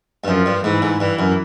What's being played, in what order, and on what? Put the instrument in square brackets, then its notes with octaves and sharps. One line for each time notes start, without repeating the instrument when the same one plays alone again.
[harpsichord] G2
[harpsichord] F#2 [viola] F3
[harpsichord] G2
[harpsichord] G#2 [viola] E3
[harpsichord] G#2
[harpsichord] G2 [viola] E3
[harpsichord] F#2